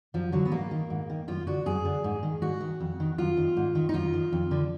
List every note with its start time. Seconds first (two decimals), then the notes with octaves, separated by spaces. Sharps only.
0.14 F#2 F3
0.32 D3 F#3
0.45 B3
0.52 G#2 A#3
0.71 D#3
0.90 G#2
1.10 D#3
1.28 F#2 F4
1.47 D3 F#4
1.66 F#2 G#4
1.85 D3
2.04 G#2
2.23 D#3
2.42 G#2 F#4
2.61 D#3
2.80 F2
3.00 D#3
3.18 F#2 F4
3.37 D#3
3.57 G#2
3.75 D#3
3.89 D#4
3.94 F#2 F4
4.14 D#3
4.32 F2
4.51 D3